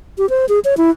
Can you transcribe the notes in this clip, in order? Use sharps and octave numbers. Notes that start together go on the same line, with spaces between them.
G4
C5
G#4
C#5
E4